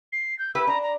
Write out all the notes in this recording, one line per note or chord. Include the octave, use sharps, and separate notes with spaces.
C7
G6
E4 G4 B4 E6
D4 A#5
A#5